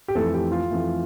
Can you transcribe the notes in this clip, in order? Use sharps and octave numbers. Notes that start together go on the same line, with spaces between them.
G4
F2 E3 A3 A4
G4
F4
F2 E3 A3